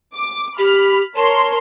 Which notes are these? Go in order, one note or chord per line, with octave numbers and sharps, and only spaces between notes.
D6
G4 B5 F6
A#4 C#5 A5 C6